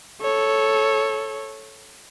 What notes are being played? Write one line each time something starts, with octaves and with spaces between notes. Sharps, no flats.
A4 C#5